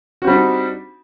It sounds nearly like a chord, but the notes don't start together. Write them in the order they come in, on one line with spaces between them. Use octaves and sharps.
F#4 C4 G3 D4 D#4